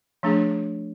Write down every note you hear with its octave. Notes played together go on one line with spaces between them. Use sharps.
F3 A3 D4 G#4